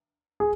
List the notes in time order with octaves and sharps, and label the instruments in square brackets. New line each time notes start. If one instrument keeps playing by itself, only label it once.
[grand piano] G#4